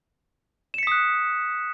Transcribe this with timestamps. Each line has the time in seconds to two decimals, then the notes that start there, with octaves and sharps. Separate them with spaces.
0.74 E7
0.78 C#7
0.83 B6
0.87 D#6
0.92 F#6